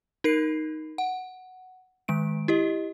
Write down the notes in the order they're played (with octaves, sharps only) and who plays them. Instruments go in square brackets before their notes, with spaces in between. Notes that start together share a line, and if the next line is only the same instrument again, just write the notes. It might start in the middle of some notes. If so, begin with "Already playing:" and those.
[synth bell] D#4 A#4 C7
F#5
D#3 G#3 D7
E4 G4 D#5